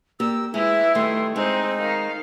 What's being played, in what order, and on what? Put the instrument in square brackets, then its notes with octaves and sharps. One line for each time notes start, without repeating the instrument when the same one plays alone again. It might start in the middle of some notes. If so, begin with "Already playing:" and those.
[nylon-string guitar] A#3 G4 D5 [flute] E6
[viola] E3 E4 [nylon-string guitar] G#3 [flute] E5
[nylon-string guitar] D#3 G3 A3 [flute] C6
[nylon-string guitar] G#3 [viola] C4 [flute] D#4
[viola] D#3 F5